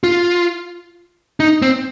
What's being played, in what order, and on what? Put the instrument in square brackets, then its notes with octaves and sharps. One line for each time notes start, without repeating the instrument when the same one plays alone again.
[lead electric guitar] F4
D#4
C4